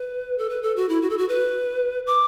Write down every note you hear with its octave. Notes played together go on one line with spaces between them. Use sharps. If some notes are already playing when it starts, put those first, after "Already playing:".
Already playing: B4
A4
B4
A4
F#4
E4
F#4
A4
F#4
B4
D6